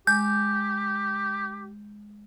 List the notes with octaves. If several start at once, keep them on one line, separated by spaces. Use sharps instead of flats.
G#3 G4 G6